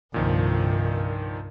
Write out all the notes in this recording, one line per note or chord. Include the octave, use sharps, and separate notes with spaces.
C2 G2 A#2 D#3 F3